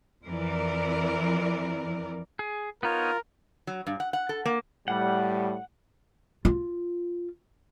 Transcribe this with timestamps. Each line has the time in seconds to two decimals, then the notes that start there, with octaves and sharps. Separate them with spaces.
0.24 F2 E3 A#4 D5
2.39 G#4
2.83 B3 D#4 F4 A#4 C#5
3.67 F#3
3.87 G2
4.00 F#5
4.13 F#5
4.29 A4
4.46 A#3
4.88 A2 G3 F#5
6.45 F4